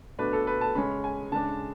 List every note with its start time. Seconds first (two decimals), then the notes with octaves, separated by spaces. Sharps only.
0.19 B2 A3 D4 B4
0.33 A4
0.47 B4
0.61 A5
0.75 C#3 G#3 C#4 B5
1.04 G#5
1.32 C#3 G#3 D4 A5